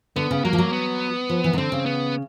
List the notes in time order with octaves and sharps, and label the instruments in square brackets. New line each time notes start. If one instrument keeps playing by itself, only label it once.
[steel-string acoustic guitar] D3 [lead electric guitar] B3
[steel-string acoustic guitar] C#3
[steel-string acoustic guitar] F#3 [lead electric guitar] A#3
[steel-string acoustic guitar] F3
F#3
[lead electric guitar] B3
[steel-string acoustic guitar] F3
E3
D#3
[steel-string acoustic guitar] D3 [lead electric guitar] C4
[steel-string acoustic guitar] C#3
[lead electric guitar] B3